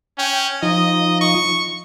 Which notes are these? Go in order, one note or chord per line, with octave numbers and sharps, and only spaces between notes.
C#4 G5
F3 D#4 D#5
C#6